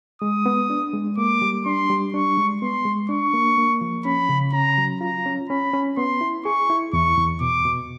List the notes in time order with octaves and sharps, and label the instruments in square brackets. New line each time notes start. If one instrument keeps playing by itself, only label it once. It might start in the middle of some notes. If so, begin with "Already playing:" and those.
[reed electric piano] G#3 [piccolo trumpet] D#6
[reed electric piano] B3
D4
G#3
[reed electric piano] A#3 [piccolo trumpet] D6
[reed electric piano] G3
[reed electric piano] D4 [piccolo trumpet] C6
[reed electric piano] G3
[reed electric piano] D4 [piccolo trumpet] C#6
[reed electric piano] G#3
[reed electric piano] B3 [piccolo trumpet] C6
[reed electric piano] G#3
[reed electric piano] D4 [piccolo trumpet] C#6
[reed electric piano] A#3
A#3
F3
[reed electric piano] C#4 [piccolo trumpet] B5
[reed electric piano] C#3
[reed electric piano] C#4 [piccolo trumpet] A#5
[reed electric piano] F#3
[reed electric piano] F4 [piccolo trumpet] A#5
[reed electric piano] C#4
[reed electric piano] C#4 [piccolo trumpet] B5
[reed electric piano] C#4
[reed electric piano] B3 [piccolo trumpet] C6
[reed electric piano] E4
[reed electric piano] G#4 [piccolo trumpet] C#6
[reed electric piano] E4
[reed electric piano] E2 [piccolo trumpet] C#6
[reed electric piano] E2
[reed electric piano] B2 [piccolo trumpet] D6
[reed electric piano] B2